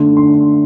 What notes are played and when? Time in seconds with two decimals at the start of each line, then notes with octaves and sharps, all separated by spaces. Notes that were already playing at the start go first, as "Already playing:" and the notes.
Already playing: D3 A3 D4 C6
0.17 C6